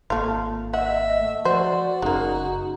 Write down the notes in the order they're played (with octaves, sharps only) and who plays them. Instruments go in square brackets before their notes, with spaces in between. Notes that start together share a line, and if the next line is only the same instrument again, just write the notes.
[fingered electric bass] G#1 A#3 [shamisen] A3 F4
[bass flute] D#5 [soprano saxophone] E5 [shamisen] F#5
[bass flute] A3
[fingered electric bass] F3 [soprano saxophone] F#4 [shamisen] C5 [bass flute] D5
[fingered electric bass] F#1 C#4 [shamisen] G#3 A#3 [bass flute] D#4